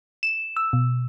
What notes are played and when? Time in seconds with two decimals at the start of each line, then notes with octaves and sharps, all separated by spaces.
0.23 E7
0.57 E6
0.73 B2